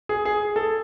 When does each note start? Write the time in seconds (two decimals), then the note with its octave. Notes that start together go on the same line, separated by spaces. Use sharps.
0.09 G#4
0.25 G#4
0.56 A4